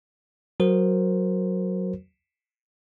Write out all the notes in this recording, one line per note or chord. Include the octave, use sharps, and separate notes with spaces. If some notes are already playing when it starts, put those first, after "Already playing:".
F#3 F#4 A#4 C5